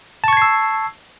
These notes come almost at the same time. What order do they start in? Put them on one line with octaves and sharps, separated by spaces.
A5 C#6 G#6 C7 E6